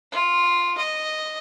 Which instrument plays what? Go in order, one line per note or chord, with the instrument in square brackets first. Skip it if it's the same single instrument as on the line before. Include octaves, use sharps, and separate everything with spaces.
[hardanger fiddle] F4
D#5